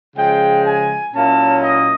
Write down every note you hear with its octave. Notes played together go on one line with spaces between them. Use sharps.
C#3 F3 G#3 G5
G#5
A#2 F#3 A#3 C#4 E4 A5
D#5